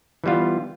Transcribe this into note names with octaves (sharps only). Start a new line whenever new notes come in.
E3 G3 B3 F4